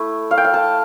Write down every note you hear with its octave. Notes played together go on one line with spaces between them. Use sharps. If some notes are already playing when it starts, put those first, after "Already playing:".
Already playing: A3 E4
F5
G5
F5
A5